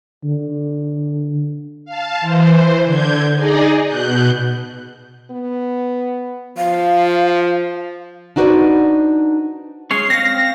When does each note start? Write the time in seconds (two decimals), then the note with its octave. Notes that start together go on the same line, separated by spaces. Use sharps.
0.24 D3
1.85 F5 A5
2.21 E3 C5
2.85 D3 G6 G#6
3.35 D#4 G#4 D5 D#5
3.86 B2 F#6 G6
5.31 B3
6.57 F3 F5
8.36 D4 D#4 F#4 B4 C5 D5
9.91 G#3 C#4 C#5 C7
10.10 C4 F5 A#6